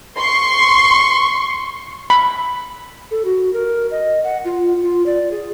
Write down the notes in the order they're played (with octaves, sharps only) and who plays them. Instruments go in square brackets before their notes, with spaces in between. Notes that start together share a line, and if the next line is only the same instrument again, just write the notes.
[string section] C6 C#6
[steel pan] B5
[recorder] A4
F#4
A#4
D#5
F#5
F4
F4
D5
G#4